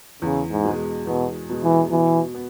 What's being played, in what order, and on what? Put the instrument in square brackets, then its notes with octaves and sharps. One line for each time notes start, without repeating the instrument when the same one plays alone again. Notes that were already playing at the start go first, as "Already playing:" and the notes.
[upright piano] E2 [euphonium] C#3
[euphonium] G#2
[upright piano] B2 G#3
[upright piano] E2 [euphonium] B2
[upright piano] B2 G#3
[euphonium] E3
[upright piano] B2 [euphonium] E3
[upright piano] B3